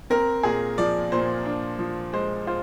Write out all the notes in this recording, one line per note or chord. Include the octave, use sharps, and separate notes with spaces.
C4 A#4
A#2 G#4
F3 D5
A#2 C5
D4
F3
G#3 C5
F4 C5